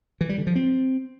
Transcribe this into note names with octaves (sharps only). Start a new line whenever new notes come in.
E3
G3
D3
F3
C4